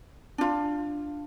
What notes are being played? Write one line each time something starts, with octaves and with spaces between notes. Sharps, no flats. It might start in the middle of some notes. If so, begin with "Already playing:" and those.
D4 F4